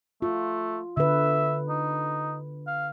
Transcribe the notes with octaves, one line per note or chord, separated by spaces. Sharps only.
A3 F4
D3 B4 E5
D#4
F5